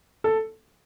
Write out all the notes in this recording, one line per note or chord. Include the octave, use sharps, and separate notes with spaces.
A4